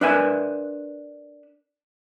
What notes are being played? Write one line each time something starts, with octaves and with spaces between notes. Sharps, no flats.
D4 A#4 B4 E5 G#5